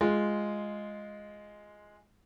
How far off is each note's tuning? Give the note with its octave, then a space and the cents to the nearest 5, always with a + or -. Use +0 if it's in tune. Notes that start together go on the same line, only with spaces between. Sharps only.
G#3 +0 F4 +0